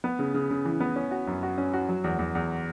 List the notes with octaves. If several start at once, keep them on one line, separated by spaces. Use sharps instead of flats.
B3
C#3
C#3
C#3
E3
B3
C#4
F#4
F#2
F#4
C#4
F#4
F#3
E2
E2
E2